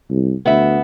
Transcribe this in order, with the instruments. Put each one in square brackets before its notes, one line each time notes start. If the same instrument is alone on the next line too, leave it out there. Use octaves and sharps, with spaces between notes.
[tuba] C2
[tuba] D2 [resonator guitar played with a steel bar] B3 E5